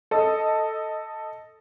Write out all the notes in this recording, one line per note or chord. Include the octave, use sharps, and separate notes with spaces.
A4 D#5